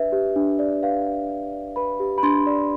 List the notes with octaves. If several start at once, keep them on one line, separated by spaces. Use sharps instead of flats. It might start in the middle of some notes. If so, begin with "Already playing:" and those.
Already playing: D4 G4 B4 D5 E5
G4
D4
D5
B4 F5
G4
D4
D5
B4 B5
G4
B5
D4 C6
D5